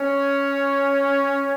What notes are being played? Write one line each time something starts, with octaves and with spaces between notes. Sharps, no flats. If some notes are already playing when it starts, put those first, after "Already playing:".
Already playing: C#4 C#5